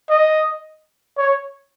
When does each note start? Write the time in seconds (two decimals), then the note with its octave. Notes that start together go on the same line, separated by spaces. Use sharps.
0.10 D#5
1.18 C#5